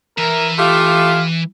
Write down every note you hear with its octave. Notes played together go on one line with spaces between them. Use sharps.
E3 A#4 E5
A3 F4 G4 F5